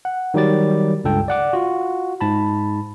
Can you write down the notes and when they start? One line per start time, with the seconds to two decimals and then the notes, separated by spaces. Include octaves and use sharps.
0.05 F#5
0.34 D#3 F#3 G3 D6 A6
1.04 C#2 G2 A4 G5
1.28 D5 F#5 D6
1.53 F4 F#4
2.21 G#2 A5 B5